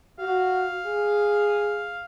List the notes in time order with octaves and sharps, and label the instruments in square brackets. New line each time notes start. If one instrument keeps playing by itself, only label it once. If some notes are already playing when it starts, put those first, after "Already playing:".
[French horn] F#4 [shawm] F5
[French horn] G#4